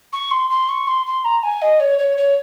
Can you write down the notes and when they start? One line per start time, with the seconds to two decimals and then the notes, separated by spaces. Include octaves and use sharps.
0.12 C#6
0.30 C6
0.50 C6
0.68 C#6
0.87 C6
1.06 C6
1.24 A#5
1.43 G#5
1.61 D#5
1.79 C#5
1.98 C#5
2.17 C#5